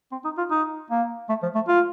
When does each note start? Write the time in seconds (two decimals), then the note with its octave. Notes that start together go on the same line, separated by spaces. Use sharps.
0.12 C4
0.25 D#4
0.38 F4
0.51 D#4
0.91 A#3
1.29 A3
1.43 F3
1.55 A3
1.68 F4